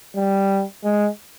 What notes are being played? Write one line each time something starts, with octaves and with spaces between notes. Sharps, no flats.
G3
G#3